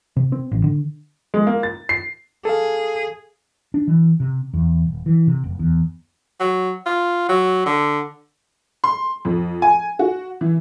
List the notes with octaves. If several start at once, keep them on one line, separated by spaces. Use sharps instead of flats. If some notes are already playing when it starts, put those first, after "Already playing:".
C3
C4
A1
D3
G#3
A#3
A6
C7
G#4 A4 F5
D4
E3
C3
E2
D#1
E3
C3
F1
E2
F#3
F4
F#3
D3
C6
F2
G#5
F#4
E3